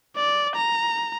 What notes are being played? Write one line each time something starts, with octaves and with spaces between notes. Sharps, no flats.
D5
A#5